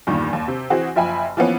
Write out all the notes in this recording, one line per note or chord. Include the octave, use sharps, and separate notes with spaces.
E2 G2 A#2 D#3
D#2
C3
E3 C4 F#4 G#4
F#1 F3 E5 G5 G#5 B5
E3 F3 A#3 B3 C#4